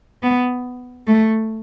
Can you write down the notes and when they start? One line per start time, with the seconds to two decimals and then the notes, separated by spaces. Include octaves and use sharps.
0.23 B3
1.08 A3